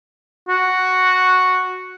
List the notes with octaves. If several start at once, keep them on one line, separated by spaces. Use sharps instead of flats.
F#4